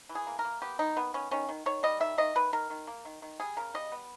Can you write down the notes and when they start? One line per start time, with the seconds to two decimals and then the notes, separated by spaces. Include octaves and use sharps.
0.09 E3
0.15 G#4
0.27 A#3
0.39 A#4
0.44 A#3
0.62 B3 G4
0.79 D#3 D#4
0.96 D#3 B3
1.14 B3 C#4
1.31 D#3 C#4
1.49 D#3
1.66 D#3 C#5
1.83 G3 D#5
2.00 D#3 E5
2.18 D#3 D#5
2.35 D#3 B4
2.53 D#3 A#4
2.70 D#3
2.87 A#3
3.05 D#3
3.22 D#3
3.40 G3 G#4
3.57 C#3 A#4
3.74 G3 D#5
3.92 B3